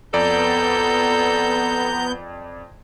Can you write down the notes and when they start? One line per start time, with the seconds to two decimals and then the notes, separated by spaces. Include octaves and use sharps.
0.14 F2 B3 A4 D5 A#5 G6